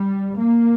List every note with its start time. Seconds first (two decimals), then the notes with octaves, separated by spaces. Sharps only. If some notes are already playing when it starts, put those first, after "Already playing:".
Already playing: G3
0.38 A#3